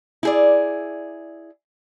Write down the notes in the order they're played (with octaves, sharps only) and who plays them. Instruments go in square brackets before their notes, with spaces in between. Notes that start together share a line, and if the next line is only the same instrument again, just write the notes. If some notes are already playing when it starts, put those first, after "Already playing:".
[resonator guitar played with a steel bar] E4 G#4 D5